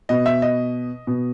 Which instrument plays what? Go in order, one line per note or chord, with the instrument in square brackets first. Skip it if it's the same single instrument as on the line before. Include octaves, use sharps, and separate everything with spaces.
[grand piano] B2 D#5
E5
D#5
B2